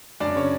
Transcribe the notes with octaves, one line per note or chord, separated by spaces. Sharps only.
F#2 D4 D5
C#3 C#4 C#5